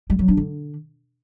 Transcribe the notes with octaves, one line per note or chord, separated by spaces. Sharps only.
G3
F#3
D4
D3